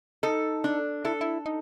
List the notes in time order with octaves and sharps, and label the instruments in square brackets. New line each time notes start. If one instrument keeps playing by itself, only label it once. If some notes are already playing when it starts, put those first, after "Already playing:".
[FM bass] D#4 [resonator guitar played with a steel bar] A4
[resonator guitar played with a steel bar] D4
[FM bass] E4 [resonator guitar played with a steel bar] A4
[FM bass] E4
D#4